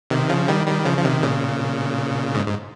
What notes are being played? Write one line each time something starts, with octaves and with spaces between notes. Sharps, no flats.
C3 D#3
C#3 F3
D#3 G3
D#3 G3
C#3 F3
F3
C3 D#3
A#2 C#3
G#2
G#2